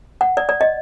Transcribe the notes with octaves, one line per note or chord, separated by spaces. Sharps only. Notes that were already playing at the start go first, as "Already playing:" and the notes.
F#5
D5
D5
D#5